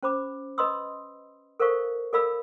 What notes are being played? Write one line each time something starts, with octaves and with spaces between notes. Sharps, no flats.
C#4 C5 B5 D6
B4 D#5 B5 C6 D#6 E6
A4 A#4 C5 F5 C#6
A4 A#4 D5 F5 B5 E6